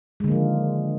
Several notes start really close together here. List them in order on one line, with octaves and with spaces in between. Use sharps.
G#3 D3 A#3 F3 D#3